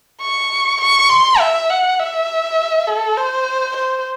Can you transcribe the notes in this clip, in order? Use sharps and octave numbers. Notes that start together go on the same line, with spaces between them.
C#6
C#6
C6
E5
F#5
E5
A4
C5
C5